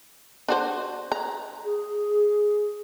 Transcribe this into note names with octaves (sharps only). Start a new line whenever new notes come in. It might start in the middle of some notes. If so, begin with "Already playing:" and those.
D4 F#4 C5
A#5
G#4